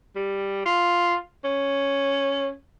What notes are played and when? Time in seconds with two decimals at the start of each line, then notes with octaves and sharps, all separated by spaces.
0.16 G3
0.65 F4
1.44 C#4